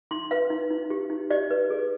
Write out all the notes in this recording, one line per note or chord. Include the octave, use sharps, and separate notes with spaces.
D#4 C6
B4 F5
D#4
D#4
G4
D#4
G4 D5
B4
G#4